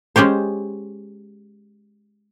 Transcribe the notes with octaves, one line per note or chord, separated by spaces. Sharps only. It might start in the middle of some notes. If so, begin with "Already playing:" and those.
G#3 C#4 G4 C5